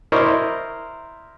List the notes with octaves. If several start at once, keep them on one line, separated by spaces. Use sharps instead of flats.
E4 A#4 C5 D5 D#5 C#6